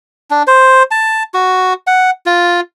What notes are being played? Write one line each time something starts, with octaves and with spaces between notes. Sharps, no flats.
D4
C5
A5
F#4
F#5
F4